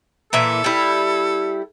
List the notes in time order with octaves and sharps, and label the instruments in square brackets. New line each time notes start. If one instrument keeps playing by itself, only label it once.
[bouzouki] A#2 E3 E5 [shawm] A4
[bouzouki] G3 E4